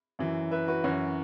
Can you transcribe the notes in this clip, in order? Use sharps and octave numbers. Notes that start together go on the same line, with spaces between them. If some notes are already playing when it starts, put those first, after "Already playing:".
F#2 E3
B4 E5
F#4 B4
F#2 E3 C#4 F#4